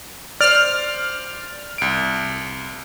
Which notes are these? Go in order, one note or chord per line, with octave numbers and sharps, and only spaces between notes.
C5 D5 F6
C2 D7